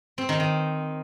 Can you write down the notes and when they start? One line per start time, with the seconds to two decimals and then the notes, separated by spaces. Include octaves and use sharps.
0.18 C4
0.29 D#3
0.40 D#3